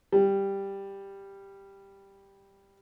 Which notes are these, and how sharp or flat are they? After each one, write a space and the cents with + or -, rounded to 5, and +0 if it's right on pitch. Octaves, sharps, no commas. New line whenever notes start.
G3 +5